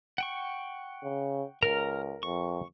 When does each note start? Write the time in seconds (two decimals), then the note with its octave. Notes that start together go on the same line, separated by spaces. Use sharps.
0.18 F#5 G5 C#6
1.03 C#3
1.63 C#2 A#4 A#5 F6
2.23 F2 C#6